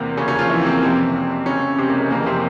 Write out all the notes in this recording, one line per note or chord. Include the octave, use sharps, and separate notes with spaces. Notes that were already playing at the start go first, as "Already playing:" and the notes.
Already playing: E2 C3 E3 A#3 C4
C#3 C#4
C#3 C#4
F3 F4
E3 E4
C4
A#3
F2 C3 E3 C4
C#3 C#4
C3 C4
A#3
G#3
F2 C#3 E3 A#3
C3 C4